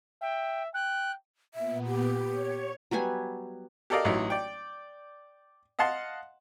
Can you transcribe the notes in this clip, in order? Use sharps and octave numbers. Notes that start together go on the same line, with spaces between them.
E5 G5
G5 F#6
A#2 B3 E5
G4
C#5
F#3 G3 B3 G#5
G4 A4 A#4 D5 D#5 F5
A1 F#3 D#4 E4
D5 G5
D#5 F5 F#5 A5 C6